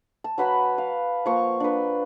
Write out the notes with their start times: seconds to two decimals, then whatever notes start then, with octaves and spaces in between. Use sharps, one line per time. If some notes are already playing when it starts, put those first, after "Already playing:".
0.24 A5
0.38 F#3 B4 F#5 B5
0.78 F5
1.26 F3 A#3 C#6
1.60 D4 B4